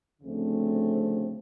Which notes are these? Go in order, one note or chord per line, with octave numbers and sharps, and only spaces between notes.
D2 C#3 F3 A3 C4